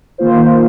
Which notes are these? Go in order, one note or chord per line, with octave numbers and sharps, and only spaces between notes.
D#3 A#3 F4 C5